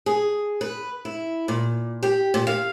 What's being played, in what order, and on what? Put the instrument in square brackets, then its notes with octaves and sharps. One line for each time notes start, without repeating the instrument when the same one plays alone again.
[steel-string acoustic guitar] G#4
B4
E4
A#2
G4
A#2
F5